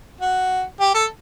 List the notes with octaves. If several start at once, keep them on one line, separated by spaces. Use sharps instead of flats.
F#4
G4
A4